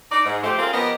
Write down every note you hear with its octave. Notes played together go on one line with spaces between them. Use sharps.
D#4 D5
G#2
F3 A3 G4 C5
G#3 C4 C#4 F4 A#4
F3 B3 G4 A#4 D#5